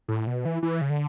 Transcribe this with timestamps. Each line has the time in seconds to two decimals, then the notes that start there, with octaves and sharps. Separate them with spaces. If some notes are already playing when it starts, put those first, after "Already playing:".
0.08 A2
0.27 B2
0.45 E3
0.63 E3
0.81 C#3
0.90 D3